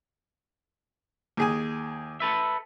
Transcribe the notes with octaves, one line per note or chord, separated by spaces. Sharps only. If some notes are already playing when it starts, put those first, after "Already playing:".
D#2 G#4 G#5
A4 B4 E5